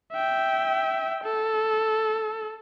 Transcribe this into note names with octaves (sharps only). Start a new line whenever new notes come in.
E5 G5
A4